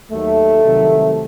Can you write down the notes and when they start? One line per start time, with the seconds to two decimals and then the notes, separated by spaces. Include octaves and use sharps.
0.12 D#2 D#3 F#3 A3
0.64 C2 C3 D#3 F#3